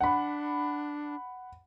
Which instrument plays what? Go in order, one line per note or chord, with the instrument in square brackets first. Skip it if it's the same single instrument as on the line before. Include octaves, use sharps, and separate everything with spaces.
[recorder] D4 [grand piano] F#5 B5